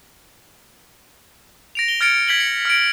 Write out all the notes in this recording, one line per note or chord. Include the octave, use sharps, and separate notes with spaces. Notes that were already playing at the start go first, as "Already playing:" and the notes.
A#6 D7 F7
G7
F6 G#6 A6 C#7 D7
G#6 B6 F#7 G7
C#7
F6 A#6 D7